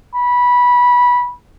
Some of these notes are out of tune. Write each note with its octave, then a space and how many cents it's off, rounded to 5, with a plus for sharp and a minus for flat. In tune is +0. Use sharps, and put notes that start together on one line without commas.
B5 -15